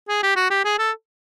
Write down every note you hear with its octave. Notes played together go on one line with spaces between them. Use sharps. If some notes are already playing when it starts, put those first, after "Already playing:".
G#4
G4
F#4
G4
G#4
A4